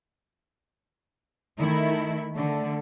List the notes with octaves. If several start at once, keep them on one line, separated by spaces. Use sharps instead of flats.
D#3 A3 E4
D3 A3